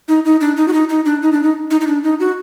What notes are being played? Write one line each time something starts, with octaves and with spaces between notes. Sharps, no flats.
D#4
D#4
D4
D#4
F#4
D#4
D#4
D4
D#4
D4
D#4
D#4
D#4
D4
D#4
F#4